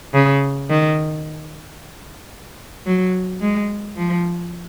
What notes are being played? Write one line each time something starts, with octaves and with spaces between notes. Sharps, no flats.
C#3
D#3
F#3
G#3
F3